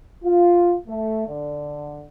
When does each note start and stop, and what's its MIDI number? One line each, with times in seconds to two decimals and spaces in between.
0.25 0.74 65
0.88 1.27 57
1.28 2.05 50